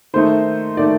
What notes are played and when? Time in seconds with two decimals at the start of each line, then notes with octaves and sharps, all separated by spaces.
0.14 D#3 A3 D#4 C5
0.77 D#3 A3 D#4 D5